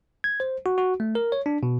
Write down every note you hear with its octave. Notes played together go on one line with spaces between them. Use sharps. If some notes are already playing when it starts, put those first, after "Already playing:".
G#6
C5
F#4
F#4
A3
A#4
C#5
D4
B2